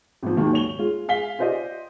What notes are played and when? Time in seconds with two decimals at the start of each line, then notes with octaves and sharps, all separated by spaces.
0.23 G#1 F3
0.37 D#2 G#2 D#3 F#3 A#3
0.53 C#5 F7 G7
0.79 G#3 F4
1.08 G#4 F5 B6 G7
1.39 F4 G4 C5 D5 D#5